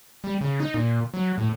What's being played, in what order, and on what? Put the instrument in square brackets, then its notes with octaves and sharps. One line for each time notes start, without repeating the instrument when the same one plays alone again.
[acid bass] G3
C#3
D#4
A#2
F#3
A2